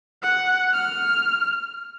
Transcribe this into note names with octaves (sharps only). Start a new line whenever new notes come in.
F#5
F6